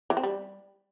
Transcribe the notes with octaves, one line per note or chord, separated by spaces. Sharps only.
E3
C4
G3